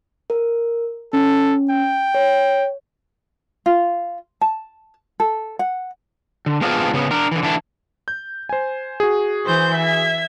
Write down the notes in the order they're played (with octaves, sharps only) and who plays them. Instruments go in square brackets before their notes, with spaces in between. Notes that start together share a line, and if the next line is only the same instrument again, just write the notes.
[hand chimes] A#4
[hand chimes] C#4 [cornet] A4
[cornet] G5
[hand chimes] C#5
[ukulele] F4
A5
A4
F#5
[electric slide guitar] D3
G#3 B3 C4 D4 F4 G#4
C#3 B3
D4 A#4
D3 E3
D3 E3 D4 E4
[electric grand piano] G6
C5 G#5
F#4 G#4
[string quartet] E3 C5 G6
E5 G#6